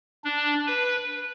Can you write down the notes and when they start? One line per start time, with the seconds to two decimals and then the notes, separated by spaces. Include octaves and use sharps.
0.24 D4
0.67 B4